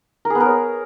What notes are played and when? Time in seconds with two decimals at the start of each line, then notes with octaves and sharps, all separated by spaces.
0.25 A#4
0.30 G#4
0.35 B3
0.40 A#4
0.46 C#5